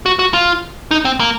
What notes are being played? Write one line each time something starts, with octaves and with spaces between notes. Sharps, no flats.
F#4
F#4
F4
D#4
C4
A#3